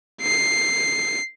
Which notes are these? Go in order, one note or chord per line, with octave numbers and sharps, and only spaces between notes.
C7